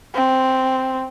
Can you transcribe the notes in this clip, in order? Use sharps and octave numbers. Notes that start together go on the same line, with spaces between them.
C4